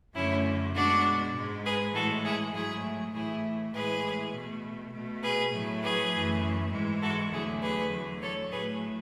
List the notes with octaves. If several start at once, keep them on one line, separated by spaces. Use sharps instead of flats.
F#2 D3 A3 C#4 E4
B2 G#3 D4 F#4
G#2 G#3
G#4 B4
A2 E3 G#3 F#4 A4
E4 G#4
G#2 F#3 A3 E4 G#4
A2 E3 A3 E4 G#4
A2 E3 G#3 G#4 B4
B2 A3
B2 A3
G#4 B4
A2 F#3 A3
G#4 B4
F#2 E3 A3
G#2 E3 G#3
F#4 A4
E2 D3 F#3 A3 E4 G#4
G#4 B4
E2 D3 F#3 A3
A4 C#5
A2 F#3 A3 G#4 B4